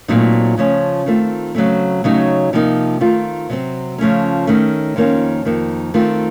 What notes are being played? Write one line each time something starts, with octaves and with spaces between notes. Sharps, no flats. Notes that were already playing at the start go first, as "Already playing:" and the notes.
A#2 F#3 A3 C4 D#4
C#3 F3 A3 C#4
D#3 A3 C4 F4
C#3 F#3 A3 C4
C#3 F#3 A3 D#4
C3 F3 A#3 D#4
D#3 A3 C4 F4
C3 F#3 C4
C#3 F3 A3 C#4
D#3 A3 C#4
F2 D#3 A#3 C#4 F4
F2 D#3 A#3
D#3 A3 C4 F4